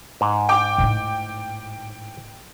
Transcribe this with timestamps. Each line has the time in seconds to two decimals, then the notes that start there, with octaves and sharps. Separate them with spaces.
0.21 G#2
0.49 G5 D6
0.78 A2 D#4